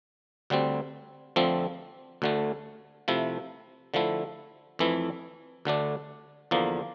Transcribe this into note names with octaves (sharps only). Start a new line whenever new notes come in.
D2 D3 G3 C4
F2 D3 F3 A3 C4
D2 D3 A3
C3 F3 A3 E4
D3 F3 A3 E4
F2 E3 A3 E4
D2 D3 A3 D4
E2 D3 F3 A#3